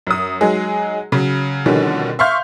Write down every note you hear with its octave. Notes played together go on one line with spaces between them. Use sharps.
F#2 D#6
F#3 G#3 D#4 G#4
C#3 F#3
B2 D3 D#3 F3 G3 C#4
E5 F5 C6 C#6 F6 G6